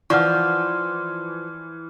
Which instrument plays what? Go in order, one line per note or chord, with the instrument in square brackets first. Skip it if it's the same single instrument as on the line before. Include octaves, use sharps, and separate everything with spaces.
[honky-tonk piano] E3 [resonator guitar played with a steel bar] F3 [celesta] D5 F#5 [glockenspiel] C#6 F6